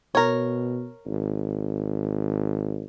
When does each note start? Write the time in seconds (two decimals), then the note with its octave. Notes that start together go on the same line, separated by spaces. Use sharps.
0.15 B2 A#4 C#5
1.06 G#1